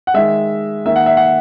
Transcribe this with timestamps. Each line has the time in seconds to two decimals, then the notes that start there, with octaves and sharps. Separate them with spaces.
0.07 F#5
0.14 D#3 G#3 E5
0.86 D#3 A#3 E5
0.96 F#5
1.06 E5
1.17 F#5